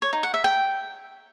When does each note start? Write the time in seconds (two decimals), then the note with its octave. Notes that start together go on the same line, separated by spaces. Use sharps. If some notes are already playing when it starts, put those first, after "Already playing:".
0.02 C#5
0.13 D#4
0.23 F#5
0.34 E5
0.44 G5